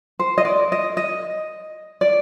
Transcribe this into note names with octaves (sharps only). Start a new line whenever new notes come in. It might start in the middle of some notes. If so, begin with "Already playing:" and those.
C5
D#5
D5
D#5
D#5
D5